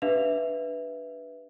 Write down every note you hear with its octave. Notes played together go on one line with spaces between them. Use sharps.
D4 G4 B4 E5 F5 F7